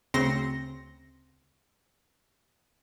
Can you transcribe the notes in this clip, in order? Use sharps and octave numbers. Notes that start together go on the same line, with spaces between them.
D2 C#3 C4 C6 A#6 C#7